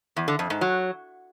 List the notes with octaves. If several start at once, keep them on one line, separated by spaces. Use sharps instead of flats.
E2
D3
F2
G#2
F#3